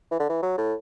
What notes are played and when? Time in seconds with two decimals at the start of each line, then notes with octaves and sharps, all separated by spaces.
0.11 E3
0.20 D3
0.29 E3
0.42 F#3
0.58 A2